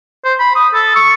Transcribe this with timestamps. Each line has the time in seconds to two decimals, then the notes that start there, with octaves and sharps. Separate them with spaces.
0.25 C5
0.40 B5
0.55 D#6
0.74 A4
0.96 C#6